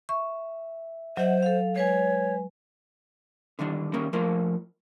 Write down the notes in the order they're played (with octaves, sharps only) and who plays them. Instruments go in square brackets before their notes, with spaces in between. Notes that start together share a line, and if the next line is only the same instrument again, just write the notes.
[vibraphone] E5 [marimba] C#6
[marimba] F#3 [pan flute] C5 [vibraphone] D#5 E5 F#5
[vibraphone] A4 F5
[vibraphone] G#3 B4 G#5 [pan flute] C#5
[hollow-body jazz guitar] D3 D#3 G3 D4
D#3 G3 A#3 C#4 A#4
F3 A3 A#3 F4 A#4